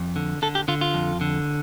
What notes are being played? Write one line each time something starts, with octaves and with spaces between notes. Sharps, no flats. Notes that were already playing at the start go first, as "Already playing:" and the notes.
Already playing: F2
D3
D3 A4
G4
D3 F4
F4
F2
D3